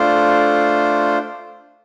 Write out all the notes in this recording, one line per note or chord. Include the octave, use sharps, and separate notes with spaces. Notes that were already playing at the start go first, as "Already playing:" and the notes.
Already playing: A3 D4 F4 C5